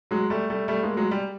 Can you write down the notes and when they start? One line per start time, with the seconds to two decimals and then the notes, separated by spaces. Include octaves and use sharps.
0.11 F#3 G#3
0.30 G3 A3
0.50 G3 A3
0.68 G3 A3
0.83 G#3 A#3
0.97 F#3 G#3
1.11 G3